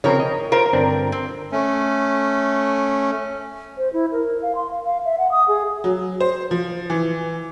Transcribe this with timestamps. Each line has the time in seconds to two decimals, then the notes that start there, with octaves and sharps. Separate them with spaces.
0.04 C#3 F3 C4 A#4 C#5
0.20 D#5
0.52 F4 A#4 C5 F5
0.73 G1 C4 D4
1.12 C4
1.52 A3 C#4
3.78 C5
3.93 E4
4.12 A#4
4.42 F5
4.55 C6
4.71 F5
4.85 F5
5.05 E5
5.19 F#5
5.32 D#6
5.48 G#4
5.84 F#3
6.20 C5
6.51 F3
6.90 E3